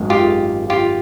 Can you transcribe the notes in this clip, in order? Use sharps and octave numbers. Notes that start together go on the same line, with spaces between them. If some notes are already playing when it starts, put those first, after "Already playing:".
Already playing: G#1 F#2 D#3 G#3
F4 G4
F4 G4